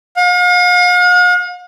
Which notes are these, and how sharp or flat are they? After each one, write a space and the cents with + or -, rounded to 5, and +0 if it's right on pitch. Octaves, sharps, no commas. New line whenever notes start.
F5 +45